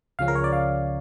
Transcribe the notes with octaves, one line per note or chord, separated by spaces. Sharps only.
C#2 C#3 F3 C#4 F5
A#4
C#5
D5
F5